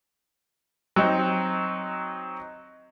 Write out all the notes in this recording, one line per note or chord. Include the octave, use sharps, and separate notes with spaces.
F#3 C4 D#4